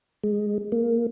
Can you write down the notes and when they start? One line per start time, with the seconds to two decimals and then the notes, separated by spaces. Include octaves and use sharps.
0.23 G#3
0.72 A#3